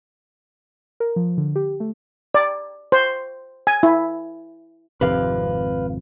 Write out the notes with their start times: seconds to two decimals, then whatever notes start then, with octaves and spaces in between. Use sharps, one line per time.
1.00 A#4
1.16 F3
1.37 D3
1.56 G4
1.80 A3
2.34 D5
2.92 C5
3.67 G#5
3.83 E4
5.01 G#1 F2 C3 B4 F5